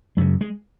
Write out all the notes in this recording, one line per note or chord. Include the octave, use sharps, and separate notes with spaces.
F#2 C#3 G#3
G#3